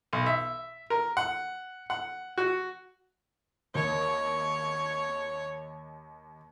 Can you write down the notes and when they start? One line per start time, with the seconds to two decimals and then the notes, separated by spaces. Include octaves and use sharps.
0.13 B1
0.26 E5
0.90 A#4
1.17 F#5
1.90 F#5
2.38 F#4
3.75 D#2 C#5